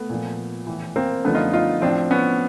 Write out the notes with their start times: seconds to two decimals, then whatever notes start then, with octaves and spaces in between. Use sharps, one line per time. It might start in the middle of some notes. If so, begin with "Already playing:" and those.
Already playing: A3 B3
0.10 A#2 F3
0.67 A2 E3
0.96 A#3 C4
1.24 F#2 D3 F3 A3 B3
1.34 D#4 F4
1.53 D#4 F4
1.82 A2 F3 C4 D4
2.11 B3 C#4